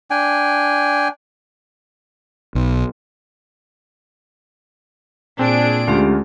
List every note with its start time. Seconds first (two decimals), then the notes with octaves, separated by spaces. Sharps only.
0.11 D4 G5 G#5
2.55 B1
5.39 A#2 C4 D4 G#4 D7
5.88 D2 G#3 C#4 F4 G4